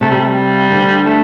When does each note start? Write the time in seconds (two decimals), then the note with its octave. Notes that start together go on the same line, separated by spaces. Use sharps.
0.01 C3 A3
0.10 G3
0.19 A3
0.28 G3
0.71 D2 D3
1.06 A3